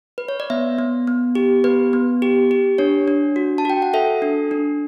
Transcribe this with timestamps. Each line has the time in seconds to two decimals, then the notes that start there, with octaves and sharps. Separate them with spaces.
0.18 B4
0.28 C#5
0.40 D5
0.50 B3 E5
0.79 B3
1.07 B3
1.35 G4
1.64 B3 B4
1.93 B3
2.22 G4
2.51 G4
2.78 D4 C#5
3.08 D4
3.36 F#4
3.58 A5
3.65 F#4 G5
3.82 F#5
3.94 A4 E5
4.22 D4
4.51 D4